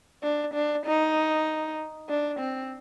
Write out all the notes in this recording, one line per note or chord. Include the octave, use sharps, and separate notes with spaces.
D4
D4
D#4
D4
C4